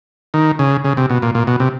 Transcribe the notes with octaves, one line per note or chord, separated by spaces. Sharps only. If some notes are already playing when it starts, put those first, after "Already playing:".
D#3
C#3
C#3
C3
B2
A#2
A#2
B2
C3